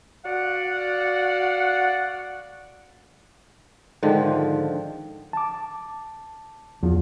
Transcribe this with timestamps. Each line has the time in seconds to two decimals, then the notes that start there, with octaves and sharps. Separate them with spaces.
0.25 F#4 D5 F5 F#5
4.03 G#2 D3 D#3 F3
5.33 A5 D6
6.83 E2 F3 F4